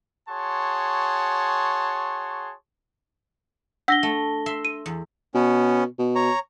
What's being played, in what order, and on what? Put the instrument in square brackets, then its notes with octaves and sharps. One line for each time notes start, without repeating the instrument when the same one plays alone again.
[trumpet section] F#4 G#4 C#5 A5 C6
[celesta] D4 A#6 G7 [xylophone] F#5 E6
[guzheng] A3
E5 C6
[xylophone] D#7
[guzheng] E2
[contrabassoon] B2 [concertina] B3 C#4
[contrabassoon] B2
[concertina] C#5 A#5